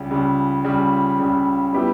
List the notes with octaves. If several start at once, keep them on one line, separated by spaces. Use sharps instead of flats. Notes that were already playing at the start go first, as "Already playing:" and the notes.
Already playing: C#2 C#3 G3
C#2 C#3 G3
C#2 C#3 G3
C#2 C#3 G3
G3 B3 E4 G4